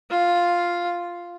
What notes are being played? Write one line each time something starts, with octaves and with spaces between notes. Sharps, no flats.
F4